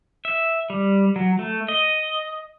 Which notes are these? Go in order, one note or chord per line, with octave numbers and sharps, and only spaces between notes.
E5
G3
F#3
A3
D#5